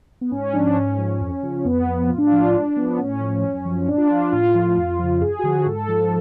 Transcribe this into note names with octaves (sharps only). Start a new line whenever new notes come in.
B3
G#2 C#4
F3 D4
D4
G#2 C#4
F3
F2
C#3 F3
F2 B3
F3
A2 F4
D4
F4
F3
G#2 D4
F3 B3
A2 C#4
F3
F#2
F3
A2 D4
F4
F3 D4
A2 F4
F3
F2
C#3 F3
F#2 G#4
F#4
D3 F3 G#4
G#2 A4
F3